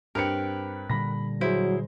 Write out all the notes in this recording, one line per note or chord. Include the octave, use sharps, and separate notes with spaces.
G2 C4 A#4 B4 G5 C#7
A#2 D3 G3 B5 A#6
F#3 E4 G#4 C5